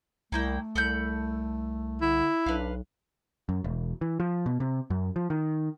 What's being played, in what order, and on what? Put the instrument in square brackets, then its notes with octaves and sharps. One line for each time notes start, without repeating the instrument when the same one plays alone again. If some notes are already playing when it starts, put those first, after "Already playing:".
[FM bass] C2 [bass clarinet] A3 [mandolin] A#3 E4 G5
[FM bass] C2 [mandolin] A4 B5 G6
[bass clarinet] D3 [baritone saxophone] E4
[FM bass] B1 [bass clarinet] D4 [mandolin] B4 F5
[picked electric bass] F#2
E1
E3
F3
B2
C3
F#2
F3
D#3